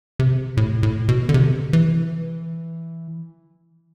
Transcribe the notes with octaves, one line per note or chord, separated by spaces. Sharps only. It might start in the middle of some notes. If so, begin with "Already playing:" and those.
C3
A2
A2
B2
D3
C3
E3